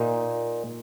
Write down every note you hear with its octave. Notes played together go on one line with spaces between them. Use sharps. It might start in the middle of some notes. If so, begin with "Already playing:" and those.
Already playing: A#2 D#4